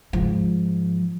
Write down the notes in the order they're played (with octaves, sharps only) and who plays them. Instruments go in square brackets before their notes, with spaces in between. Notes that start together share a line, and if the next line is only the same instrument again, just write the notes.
[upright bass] G#2 F3